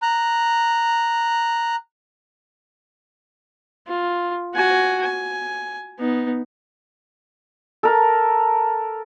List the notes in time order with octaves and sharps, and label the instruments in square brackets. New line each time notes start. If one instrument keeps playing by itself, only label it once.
[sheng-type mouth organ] A#5 F#6
[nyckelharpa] F4
F#4 G#5
G#5
B3 D#4
[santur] A4 A#4